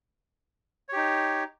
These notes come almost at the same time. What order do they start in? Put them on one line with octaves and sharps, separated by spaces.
C#5 G4 D#4